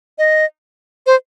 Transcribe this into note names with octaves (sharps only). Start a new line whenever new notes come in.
D#5
C5